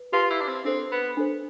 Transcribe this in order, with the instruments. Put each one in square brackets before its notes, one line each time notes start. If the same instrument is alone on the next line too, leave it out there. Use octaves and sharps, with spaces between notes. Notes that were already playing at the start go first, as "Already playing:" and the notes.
Already playing: [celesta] B4
[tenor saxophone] F4 [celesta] G4 B4 F5 C6
[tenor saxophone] E4
D4
C4
[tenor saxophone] C4 [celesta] D4 A4 C5
[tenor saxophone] B3
[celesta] D4 A4 C5